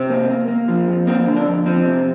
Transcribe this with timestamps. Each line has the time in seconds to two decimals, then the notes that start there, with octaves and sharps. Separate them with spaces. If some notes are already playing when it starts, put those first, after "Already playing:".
Already playing: C3 C4
0.10 A#3
0.29 A#3
0.48 A#3
0.68 F3
0.88 F2
1.07 A#3 C4
1.26 D3
1.36 D4
1.46 F2
1.66 F3 C4
1.85 C3